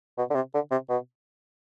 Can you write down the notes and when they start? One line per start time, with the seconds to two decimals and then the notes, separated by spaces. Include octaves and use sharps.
0.18 B2
0.30 D3
0.35 C3
0.54 D3
0.71 C3
0.89 B2